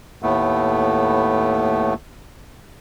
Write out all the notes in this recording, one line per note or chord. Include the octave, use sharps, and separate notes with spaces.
D#2 A2 A3 B3